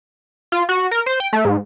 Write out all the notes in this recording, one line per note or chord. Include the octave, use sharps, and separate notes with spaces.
F4
F#4
A#4
C5
G5
A3
G#2